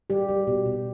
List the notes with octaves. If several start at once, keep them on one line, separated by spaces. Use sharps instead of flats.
G3 G4
G3
B2
B2